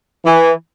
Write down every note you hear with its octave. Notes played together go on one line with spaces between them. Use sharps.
E3